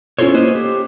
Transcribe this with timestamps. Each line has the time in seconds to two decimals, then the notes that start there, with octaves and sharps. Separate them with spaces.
0.19 C#4 E4 F4 A4 C5 C#5
0.34 A#3 B4 C5 D#5
0.55 G4